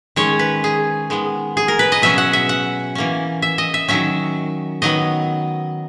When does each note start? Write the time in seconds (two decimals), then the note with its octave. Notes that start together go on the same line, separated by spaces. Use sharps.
0.16 D#3 G#3 C#4 C#5
0.39 B4
0.64 G#4
1.10 D#3 G#3 B3
1.57 G#4
1.68 A#4
1.79 B4
1.92 D#5
2.02 B2 F#3 C#4 E5
2.18 F#5
2.33 E5
2.49 F#5
2.95 E3 A#3 C#4
3.42 E5
3.58 D#5
3.74 E5
3.88 D#3 F#3 C#4 E5
4.82 D#3 F#3 B3 D#5